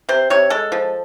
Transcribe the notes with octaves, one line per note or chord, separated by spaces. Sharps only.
C3 C5
C3 C#5
G#3 A4
F3